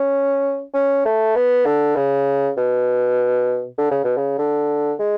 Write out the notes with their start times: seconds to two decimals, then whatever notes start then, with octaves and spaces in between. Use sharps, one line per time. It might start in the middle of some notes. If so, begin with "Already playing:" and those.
Already playing: C#4
0.74 C#4
1.05 A3
1.35 B3
1.66 D3
1.96 C#3
2.57 B2
3.78 D3
3.91 C#3
4.04 B2
4.17 C#3
4.38 D3
4.99 G#3